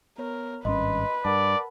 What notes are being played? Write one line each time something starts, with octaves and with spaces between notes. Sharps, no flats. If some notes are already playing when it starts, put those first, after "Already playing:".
B3 A#4 C#5
G#1 G2 C#4 B4 D#5 C6
G2 A#4 D5 F#5 A5